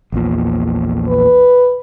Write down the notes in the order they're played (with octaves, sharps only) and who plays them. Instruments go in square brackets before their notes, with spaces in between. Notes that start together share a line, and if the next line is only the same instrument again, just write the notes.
[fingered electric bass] A#1 E2 A#2
[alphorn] B4